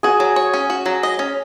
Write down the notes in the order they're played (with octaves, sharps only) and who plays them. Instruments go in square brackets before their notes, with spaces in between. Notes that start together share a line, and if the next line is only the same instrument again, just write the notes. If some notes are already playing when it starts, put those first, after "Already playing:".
[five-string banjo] F#4 [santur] G#4 G#5
[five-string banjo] F#3
C#5
C#4
F#4
F#3
D#5
C#4